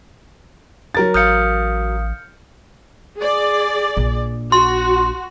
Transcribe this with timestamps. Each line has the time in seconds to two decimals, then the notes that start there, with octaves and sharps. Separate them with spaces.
0.95 F#3 A#4 A6
1.14 A1 F5 D#6 F6 G6 C#7
3.17 G#4 D5
3.97 A#1
4.52 F#4 C6